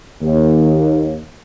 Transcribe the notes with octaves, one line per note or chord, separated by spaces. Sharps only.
D#2